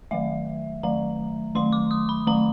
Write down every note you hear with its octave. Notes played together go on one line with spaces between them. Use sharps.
D#3 F#3 A3 E5
D#3 F#3 A3 A#5
D#3 F#3 A3 C6
D6
D#6
B5
D#3 F#3 A3 A#5